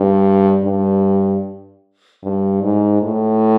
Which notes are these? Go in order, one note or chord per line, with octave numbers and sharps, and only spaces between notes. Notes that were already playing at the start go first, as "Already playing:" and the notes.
Already playing: G2
G2
G2
G#2
A2